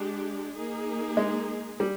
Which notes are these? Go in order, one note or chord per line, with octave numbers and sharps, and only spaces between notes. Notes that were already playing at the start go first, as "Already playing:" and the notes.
Already playing: G#3 D4 G4
A#3 D#4 G#4
G#3
G3